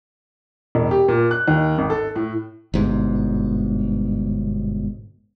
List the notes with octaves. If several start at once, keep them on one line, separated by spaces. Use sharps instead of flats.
E1
G4
A#2
F#6
D#2
G#1
A4
A2
G1 G#2 B2